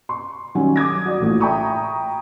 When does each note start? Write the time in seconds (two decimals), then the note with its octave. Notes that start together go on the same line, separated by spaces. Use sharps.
0.09 C6 C#6
0.55 D#3 F#3 G3 C#4
0.76 D6 D#6 G#6 A#6
1.05 F#4 D5
1.20 A#1 A2 E3 F4 F#4
1.40 E5 G5 A#5 B5 C#6 D#6